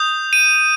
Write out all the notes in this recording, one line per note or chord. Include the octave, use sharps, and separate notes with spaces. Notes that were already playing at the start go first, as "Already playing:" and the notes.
Already playing: D#6 G6
D#7